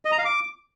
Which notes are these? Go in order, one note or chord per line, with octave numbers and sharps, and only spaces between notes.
D#5
A#5
F5
D6